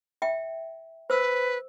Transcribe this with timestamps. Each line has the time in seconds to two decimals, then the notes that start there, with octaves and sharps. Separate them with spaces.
0.22 E5 G5
1.10 B4 C5 E6